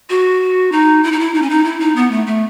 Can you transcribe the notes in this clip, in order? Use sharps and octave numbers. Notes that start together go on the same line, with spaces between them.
F#4
D#4
E4
D#4
E4
D#4
C#4
D#4
E4
D#4
B3
A3
A3